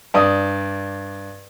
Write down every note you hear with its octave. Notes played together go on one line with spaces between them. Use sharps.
G2 D5 D#6